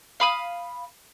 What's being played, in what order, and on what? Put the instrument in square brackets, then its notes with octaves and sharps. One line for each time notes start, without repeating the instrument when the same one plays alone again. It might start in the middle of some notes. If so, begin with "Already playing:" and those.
[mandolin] F5 B5 D#6